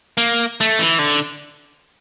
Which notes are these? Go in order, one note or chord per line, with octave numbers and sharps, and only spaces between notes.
A#3
A3
E3
D3